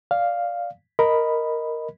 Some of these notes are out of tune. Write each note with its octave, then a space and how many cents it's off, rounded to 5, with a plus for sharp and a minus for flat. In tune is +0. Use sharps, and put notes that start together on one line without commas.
D5 -5 F5 +0
A#4 +0 D#5 +0 B5 +0